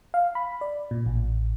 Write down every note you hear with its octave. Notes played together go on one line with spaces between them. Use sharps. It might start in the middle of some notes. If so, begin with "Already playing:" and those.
F5
B5
D5
A#2
A1